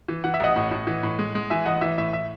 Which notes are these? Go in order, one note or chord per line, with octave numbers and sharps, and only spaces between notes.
E3
E3 F#5
E5
A1 D#5 F#5
A2
A2
E3
A2
G#3
G#3
E3 E5 G#5
A1 D#5 F#5
E3 E5
A2 E5
E5